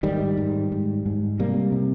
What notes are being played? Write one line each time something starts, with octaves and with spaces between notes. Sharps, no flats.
G#2 D#3 G3
G#2
G#2
G#2
C3 G3 A#3
C3